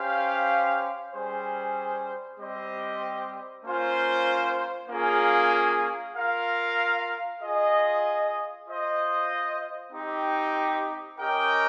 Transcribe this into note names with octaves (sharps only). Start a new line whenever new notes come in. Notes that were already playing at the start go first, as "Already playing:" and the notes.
Already playing: C#4 G4 C5 F5
G3 C#4 G#4 C5
G3 C4 G4 C5 D#5
A#3 C#4 F4 C5
A#3 C#4 F4 G#4
F4 A#4 F5
F4 G#4 D#5
F4 C5 D#5
C4 D#4 G4
C#4 G4 A#4 D#5 G5